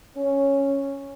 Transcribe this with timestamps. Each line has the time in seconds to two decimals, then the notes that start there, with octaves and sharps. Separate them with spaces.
0.16 C#4